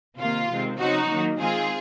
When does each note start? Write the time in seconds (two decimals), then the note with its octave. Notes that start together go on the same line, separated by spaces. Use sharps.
0.19 C3 D#3 A#3 F4
0.49 C3 D#3 G#3 C4
0.79 C#3 F#3 C4 D#4 F#4
1.09 D#3 F#3 A#3
1.38 D#3 G#3 C4 F4 G#4